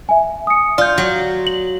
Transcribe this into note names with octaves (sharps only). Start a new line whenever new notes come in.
E5 G#5
D#6 C#7
F4 D5 G6
F#3
F#7